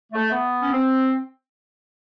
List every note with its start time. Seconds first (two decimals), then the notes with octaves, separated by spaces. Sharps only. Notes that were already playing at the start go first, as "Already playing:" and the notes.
0.13 A3
0.31 B3
0.61 C#4
0.71 C4